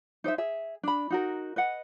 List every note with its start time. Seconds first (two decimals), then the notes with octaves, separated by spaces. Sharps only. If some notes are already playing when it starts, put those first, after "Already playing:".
0.24 D#4 C5 D5 E5
0.38 G#4 E5
0.83 D4 B5
1.10 D#4 F#4 A#4
1.56 B4 D#5 F#5